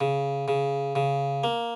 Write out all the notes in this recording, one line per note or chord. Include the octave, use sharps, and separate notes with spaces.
C#3
C#3
C#3
A#3